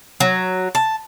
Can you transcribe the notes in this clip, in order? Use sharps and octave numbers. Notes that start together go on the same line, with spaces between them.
F#3
A5